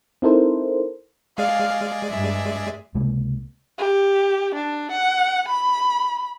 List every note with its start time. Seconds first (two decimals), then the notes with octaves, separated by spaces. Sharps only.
0.22 C4 D#4 E4 A4 A#4 C5
1.38 G#3 G#4 D5 F5
2.11 G2 E5
2.95 C#2 C3 G#3 A#3
3.78 G4
4.55 D4
4.92 F#5
5.48 B5